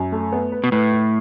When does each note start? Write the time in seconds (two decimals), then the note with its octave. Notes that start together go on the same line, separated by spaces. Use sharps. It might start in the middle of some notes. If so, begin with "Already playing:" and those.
Already playing: F#2
0.12 A3
0.33 B3
0.52 B4
0.64 B2
0.72 A2 B4
0.92 E4